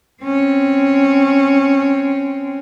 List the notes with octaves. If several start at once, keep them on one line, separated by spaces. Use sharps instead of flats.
C4 C#4